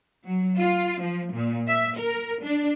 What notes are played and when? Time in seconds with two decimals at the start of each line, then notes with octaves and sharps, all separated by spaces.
0.25 F#3
0.59 F4
1.01 F3
1.33 A#2
1.67 E5
1.97 A#4
2.43 D4